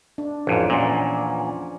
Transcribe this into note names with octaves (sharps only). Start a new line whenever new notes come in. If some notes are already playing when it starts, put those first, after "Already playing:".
D4
A1 F2 G#2 F3
E2 A#2 C#4 D4